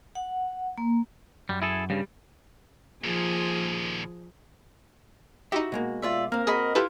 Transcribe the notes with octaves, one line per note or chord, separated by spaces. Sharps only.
F#5
A#3
F#2 G3
E4 G#4 A4
G2 C#3 G3
D#2 A#2 F3 G#4
D#4 E4 F#4 G4 E5
B2 G#3 A#3
F4 D5 E5
A#3 C4 A#4 F5
F#4 G#4 D#5 B5
E4 F4 G4 A4 B4